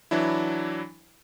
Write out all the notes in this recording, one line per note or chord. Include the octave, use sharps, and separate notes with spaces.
E3 F#3 D4 E4